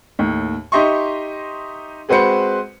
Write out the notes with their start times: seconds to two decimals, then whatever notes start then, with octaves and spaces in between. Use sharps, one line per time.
0.19 D#2 A2
0.72 D#4 G4 D#5 E5 C6 C#6
2.09 G#3 C4 F#4 B4 C5 C#7